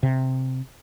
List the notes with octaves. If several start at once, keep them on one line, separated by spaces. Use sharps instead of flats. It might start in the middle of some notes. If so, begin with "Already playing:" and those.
C3